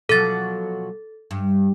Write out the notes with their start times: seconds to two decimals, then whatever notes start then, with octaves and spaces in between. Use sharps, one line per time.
0.09 B2 F3 F#3 A4 A6
1.31 G2